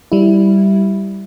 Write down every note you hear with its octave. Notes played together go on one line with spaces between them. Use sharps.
G3 E4